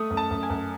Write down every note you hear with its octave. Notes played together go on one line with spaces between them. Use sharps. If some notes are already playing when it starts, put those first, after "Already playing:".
Already playing: A3 D#6
F#2
A5
F#2
G#5
F#2